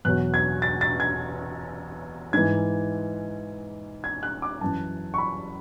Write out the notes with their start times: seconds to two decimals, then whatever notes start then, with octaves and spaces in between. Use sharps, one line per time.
0.05 E2 B2 F#3 F#6
0.34 G#6
0.62 A6
0.81 A6
1.00 G#6
2.33 G#2 E3 G#6
4.04 G#6
4.23 F#6
4.42 D6
4.61 F#2 E3 A5
5.14 C#6
5.18 B5